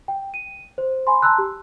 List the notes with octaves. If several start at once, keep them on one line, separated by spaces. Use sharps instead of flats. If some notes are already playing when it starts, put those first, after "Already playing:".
G5
D#7
C5
G#5 B5 C6
A5 A#5 C6 E6 F#6
G4